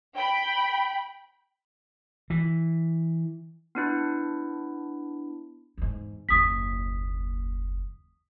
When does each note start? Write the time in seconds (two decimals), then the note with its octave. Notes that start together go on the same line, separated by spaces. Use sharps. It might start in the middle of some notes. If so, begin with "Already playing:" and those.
0.16 G5 B5
2.30 E3
3.75 B3 D4 E4
5.78 E2 G#2
6.29 F#1 D#2 D#6 B6